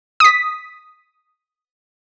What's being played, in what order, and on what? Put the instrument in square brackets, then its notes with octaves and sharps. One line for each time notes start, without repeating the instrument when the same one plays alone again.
[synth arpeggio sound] D#6 B6